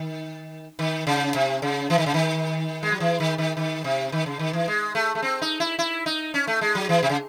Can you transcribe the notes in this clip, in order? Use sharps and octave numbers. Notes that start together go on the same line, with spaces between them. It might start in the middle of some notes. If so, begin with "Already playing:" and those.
Already playing: D#3
D#3
C#3
C3
C#3
E3
D#3
C#3
D#3
G#3
F#3
E3
D#3
D#3
D#3
C3
D#3
C#3
D#3
E3
G#3
A3
A3
C4
D#4
E4
E4
D#4
C#4
A3
G#3
F#3
E3
C3
C#3